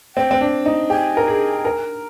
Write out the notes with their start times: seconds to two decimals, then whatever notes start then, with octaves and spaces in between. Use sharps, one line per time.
0.16 C4 G5
0.31 C4
0.41 D4
0.66 D#4
0.90 G4 G#5
1.17 A#4
1.28 G#4
1.65 A#4